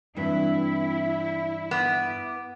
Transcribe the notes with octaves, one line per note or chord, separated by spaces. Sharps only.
G2 E3 C4 E4
B3 D6